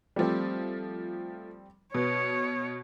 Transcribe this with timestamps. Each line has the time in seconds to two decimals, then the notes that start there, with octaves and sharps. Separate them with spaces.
0.16 F3 G3 A3 C4
1.94 B2 B4 C#5